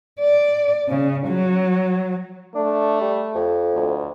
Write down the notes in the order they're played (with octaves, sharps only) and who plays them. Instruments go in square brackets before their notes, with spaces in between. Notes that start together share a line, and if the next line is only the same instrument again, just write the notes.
[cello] D5
C#3
F#3
[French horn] A3 [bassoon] D4
[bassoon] G3
F2
[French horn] D2